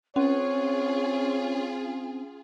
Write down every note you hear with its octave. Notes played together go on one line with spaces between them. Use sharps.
C4 C#4 F4 G#4 C#5